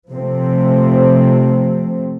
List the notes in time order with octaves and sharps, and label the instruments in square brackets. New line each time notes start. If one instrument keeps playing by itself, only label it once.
[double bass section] C3 F3 A3 C4